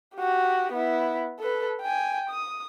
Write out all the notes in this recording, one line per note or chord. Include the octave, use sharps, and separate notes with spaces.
F#4 G4
B3 E4
A4 B4
G5 G#5
D#6